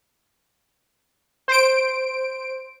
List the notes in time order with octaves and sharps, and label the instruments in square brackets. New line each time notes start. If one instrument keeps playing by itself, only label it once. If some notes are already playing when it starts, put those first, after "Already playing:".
[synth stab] C5 D7